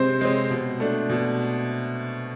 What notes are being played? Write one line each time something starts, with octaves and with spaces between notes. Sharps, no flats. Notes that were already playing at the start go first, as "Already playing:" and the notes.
Already playing: C3 G#3 C4 C5
G#3 C4
B2
A3 D4
B2